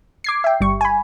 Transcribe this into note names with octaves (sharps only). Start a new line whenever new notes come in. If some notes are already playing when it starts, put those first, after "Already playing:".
D6 G#6 C7
E5 G5
G1 G3 C#6
G#5 B5